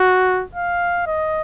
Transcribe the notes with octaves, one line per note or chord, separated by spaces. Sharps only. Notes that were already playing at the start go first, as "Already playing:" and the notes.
Already playing: F#4
F5
D#5